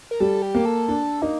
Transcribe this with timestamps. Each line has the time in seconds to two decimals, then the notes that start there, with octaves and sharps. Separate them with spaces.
0.11 A#4
0.20 G3 A4
0.42 G4
0.55 A#3
0.65 A4
0.88 D4 A4
1.22 A#3 D#4